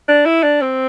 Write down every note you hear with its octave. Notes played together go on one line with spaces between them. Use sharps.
D4
E4
D4
C4